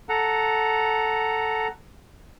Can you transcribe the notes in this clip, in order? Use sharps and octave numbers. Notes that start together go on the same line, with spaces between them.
A4 F#5 A#5